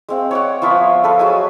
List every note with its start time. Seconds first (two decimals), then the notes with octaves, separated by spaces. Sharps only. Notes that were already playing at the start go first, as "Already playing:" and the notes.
0.09 G#3 C4 F5
0.31 C#5 D5 F#5
0.62 F3 B3 F4 E5
1.04 A4 B4 F5
1.19 F#3 G#3 G#5